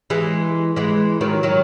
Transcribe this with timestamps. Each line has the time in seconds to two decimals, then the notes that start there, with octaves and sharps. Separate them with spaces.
0.10 E3 G#3
0.76 E3 G#3
1.21 D#3 F#3
1.43 D#3 F#3